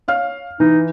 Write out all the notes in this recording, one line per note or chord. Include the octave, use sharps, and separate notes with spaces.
C#5 F5 F6
E3 D#4